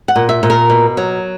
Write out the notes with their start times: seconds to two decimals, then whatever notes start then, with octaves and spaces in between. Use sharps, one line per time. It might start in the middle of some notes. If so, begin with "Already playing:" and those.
0.08 F#5
0.16 A#2
0.29 E5
0.43 A#2
0.50 A#4
0.70 B2
0.97 F#3